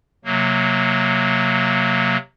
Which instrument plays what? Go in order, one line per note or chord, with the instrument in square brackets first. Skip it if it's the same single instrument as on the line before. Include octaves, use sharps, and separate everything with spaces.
[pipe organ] C3 F#3 A#3